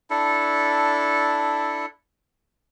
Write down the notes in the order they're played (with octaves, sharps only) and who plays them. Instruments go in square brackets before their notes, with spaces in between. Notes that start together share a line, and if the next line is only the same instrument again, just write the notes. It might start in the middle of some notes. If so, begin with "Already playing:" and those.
[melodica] D4 E4 A4